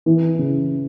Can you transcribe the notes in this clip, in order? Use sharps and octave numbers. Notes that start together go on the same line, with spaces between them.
E3
C#3